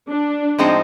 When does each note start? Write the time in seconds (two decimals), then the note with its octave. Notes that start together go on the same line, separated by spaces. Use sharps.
0.08 D4
0.58 A2 F3 G#3 C4 D#4